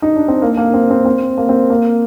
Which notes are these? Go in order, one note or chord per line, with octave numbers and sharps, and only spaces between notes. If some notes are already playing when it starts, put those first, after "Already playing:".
D#4
D4
C4
A#3
A#3
C4
C4
C4
A#3
C4
A#3